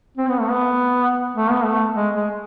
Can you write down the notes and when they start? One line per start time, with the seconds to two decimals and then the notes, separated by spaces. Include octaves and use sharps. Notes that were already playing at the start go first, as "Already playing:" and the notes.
0.17 C4
0.29 B3
0.41 A3
0.50 B3
1.36 A3
1.51 B3
1.64 A3
1.96 G#3
2.15 G#3